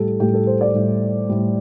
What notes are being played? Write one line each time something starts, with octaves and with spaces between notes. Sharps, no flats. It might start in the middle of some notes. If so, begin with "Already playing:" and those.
Already playing: A2 G3 G4 A4
A2 G3 G4
A4
C5
D5
A2 G3
A2 G3